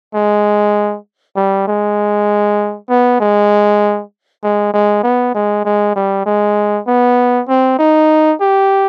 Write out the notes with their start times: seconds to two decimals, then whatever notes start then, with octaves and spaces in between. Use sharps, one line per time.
0.15 G#3
1.36 G3
1.68 G#3
2.90 B3
3.20 G#3
4.43 G#3
4.74 G#3
5.04 B3
5.34 G#3
5.65 G#3
5.96 G3
6.26 G#3
6.87 B3
7.48 C4
7.79 D#4
8.41 G4